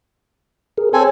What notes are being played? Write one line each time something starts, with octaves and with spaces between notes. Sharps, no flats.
G#4 A#4
C4 A4 C#5 G#5